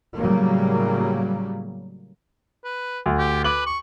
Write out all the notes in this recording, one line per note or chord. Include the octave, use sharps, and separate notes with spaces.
A2 C#3 F#3 G3 A#3
B4
D2
G4
B4 D6 F#7
C#6